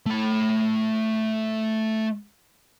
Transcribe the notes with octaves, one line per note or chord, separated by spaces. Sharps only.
A3 B5